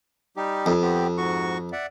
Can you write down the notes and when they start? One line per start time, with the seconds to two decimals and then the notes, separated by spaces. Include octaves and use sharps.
0.37 G3 D#4 G4
0.66 F2
0.82 B3 C4 G4
1.17 G#2 F#4 C#6
1.72 D5 E5 F#5